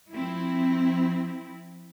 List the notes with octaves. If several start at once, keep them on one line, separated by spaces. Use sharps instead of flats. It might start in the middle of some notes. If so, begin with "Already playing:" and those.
F3 C4 E4